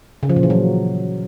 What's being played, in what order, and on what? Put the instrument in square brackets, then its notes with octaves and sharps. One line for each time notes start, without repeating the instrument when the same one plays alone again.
[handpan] C#3
F3
A#2
E3
F#3